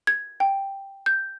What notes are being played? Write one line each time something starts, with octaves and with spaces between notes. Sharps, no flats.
G#6
G5
G6